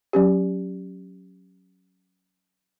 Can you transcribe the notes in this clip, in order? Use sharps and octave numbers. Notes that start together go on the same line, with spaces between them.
F#3 C#4 G4